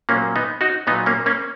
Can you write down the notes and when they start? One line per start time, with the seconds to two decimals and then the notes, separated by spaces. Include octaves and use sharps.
0.09 A#2 F#3 A#3 C#4
0.36 B3 D#4
0.61 D#4 F#4
0.87 A#2 F#3 B3 D#4
1.06 A#3 C#4
1.26 A#3 C#4